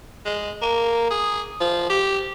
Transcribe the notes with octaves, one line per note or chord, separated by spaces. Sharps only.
G#3
A#3
G#4
F3
G4